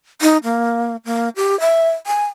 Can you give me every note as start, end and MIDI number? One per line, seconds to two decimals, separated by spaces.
0.21 0.38 63
0.44 0.96 58
1.05 1.29 58
1.36 1.58 67
1.60 1.89 76
2.07 2.25 80